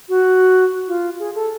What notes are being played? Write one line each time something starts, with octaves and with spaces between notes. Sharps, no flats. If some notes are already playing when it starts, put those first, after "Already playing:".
F#4
F4
G#4
A4